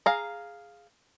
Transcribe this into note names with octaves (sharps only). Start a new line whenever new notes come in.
G#4 F5 A#5